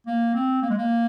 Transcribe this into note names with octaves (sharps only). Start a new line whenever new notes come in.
A#3
C4
A#3
G#3
A#3